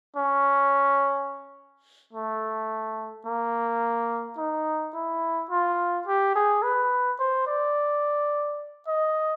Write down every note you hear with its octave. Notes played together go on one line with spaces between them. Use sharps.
C#4
A3
A#3
D#4
E4
F4
G4
G#4
B4
C5
D5
D#5